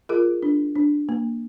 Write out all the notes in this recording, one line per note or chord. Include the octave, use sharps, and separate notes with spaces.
F4 G#4 A#4
D4
D4
A#3